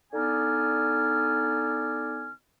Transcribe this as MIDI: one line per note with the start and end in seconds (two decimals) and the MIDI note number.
0.13 2.29 50
0.13 2.29 59
0.13 2.29 63
0.13 2.29 74
0.13 2.29 80
0.13 2.29 89